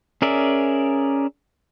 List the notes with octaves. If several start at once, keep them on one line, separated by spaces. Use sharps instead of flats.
C#4 G#4 A#4 D5 E5